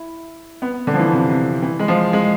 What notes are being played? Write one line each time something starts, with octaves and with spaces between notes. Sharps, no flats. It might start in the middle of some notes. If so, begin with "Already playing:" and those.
Already playing: E4
B3
D3
F3
E3
C3
C3
E3
G#3
F3
G#3